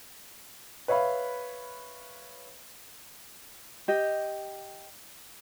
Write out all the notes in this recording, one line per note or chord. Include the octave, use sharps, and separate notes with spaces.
B4 C#5 E5 F5 B5
G4 D#5